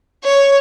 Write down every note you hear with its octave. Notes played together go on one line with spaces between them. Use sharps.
C#5